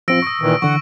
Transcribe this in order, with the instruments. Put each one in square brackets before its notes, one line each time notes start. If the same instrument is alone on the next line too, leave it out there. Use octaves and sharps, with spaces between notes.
[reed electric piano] F3 C4 F4 [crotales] E6 A#6 D7
[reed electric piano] C#6 D#6
[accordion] A#2 D#3 E3
[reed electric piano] D3 E3 [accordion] F#5 [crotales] C#6